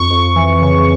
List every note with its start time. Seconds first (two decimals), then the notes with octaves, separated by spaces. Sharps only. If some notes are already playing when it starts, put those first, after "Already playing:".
Already playing: F2 C#6
0.10 F2
0.36 E3
0.61 C#3